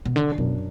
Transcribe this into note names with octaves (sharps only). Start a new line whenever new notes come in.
B2
D3 D4
F#2 B2